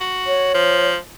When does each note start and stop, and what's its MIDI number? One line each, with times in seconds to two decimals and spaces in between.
0.01 0.53 66
0.27 0.88 73
0.54 0.97 53